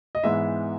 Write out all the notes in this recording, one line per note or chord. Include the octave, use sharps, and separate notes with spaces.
D#5
G#2 E3 G#3 B3 E5